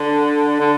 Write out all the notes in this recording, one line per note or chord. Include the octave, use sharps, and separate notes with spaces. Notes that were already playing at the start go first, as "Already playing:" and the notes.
Already playing: D3
D3